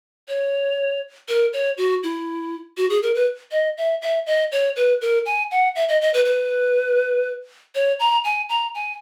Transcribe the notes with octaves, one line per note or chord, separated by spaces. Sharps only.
C#5
A#4
C#5
F#4
E4
F#4
G#4
A#4
B4
D#5
E5
E5
D#5
C#5
B4
A#4
G#5
F#5
E5
D#5
D#5
B4
B4
C#5
A#5
G#5
A#5
G#5